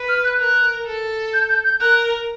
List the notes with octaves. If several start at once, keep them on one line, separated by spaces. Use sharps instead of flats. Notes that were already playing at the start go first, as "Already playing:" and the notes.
Already playing: B4
F6
F#6
A#4 F#6
A4
G6
G6
G6
A#4 F#6